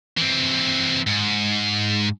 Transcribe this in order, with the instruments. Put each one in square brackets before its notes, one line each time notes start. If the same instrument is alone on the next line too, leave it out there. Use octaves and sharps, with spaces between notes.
[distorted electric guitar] E3 C4
G#2